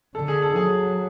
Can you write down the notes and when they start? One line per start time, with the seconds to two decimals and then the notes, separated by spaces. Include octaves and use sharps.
0.15 D3 A4
0.28 G#4
0.42 A4
0.55 F#3 G#4